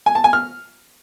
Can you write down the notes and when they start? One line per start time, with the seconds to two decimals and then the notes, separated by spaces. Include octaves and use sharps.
0.06 G#5
0.15 A5
0.24 G#5
0.33 F6